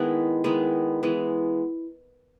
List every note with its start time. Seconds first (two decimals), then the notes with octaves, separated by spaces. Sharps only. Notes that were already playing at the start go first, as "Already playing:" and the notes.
Already playing: D#3 G#3 B3 E4
0.44 D#3 G#3 B3 E4
1.03 E3 G#3 B3